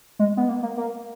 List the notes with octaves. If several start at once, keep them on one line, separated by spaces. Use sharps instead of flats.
G#3
B3
A#3
A#3
A#3